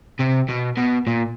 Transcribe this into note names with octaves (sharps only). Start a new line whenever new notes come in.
C3
B2
B2
A#2